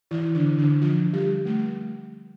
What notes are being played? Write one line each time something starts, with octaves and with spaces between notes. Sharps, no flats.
E3 E4
D3 D4
D3 D4
F3 F4
G3 G4
A3